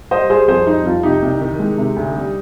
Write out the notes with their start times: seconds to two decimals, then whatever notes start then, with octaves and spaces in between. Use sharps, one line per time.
0.11 G3 C5 D#5
0.30 G3 G#4 C5
0.48 F2 G#4 C5
0.67 G3 D#4
0.86 F2 F4
1.03 C3 D#4 G4
1.22 C2
1.41 D#3
1.59 G#3
1.78 C3
1.96 D2
2.16 G3